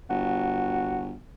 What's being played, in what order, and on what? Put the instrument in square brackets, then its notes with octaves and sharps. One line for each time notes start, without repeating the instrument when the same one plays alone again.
[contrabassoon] G1 [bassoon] F#4